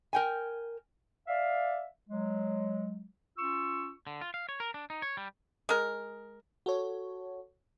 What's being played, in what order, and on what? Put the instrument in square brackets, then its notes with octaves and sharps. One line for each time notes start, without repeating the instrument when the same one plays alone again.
[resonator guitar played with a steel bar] A#4 G5 G#5
[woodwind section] D5 E5 F5
F#3 G#3
C#4 F4 C#6 E6
[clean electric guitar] D3
F4
F5
C#5
A#4
D4
D#4
C#5
G3
[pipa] G#3 A#4
[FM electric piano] F#4 A4 C#5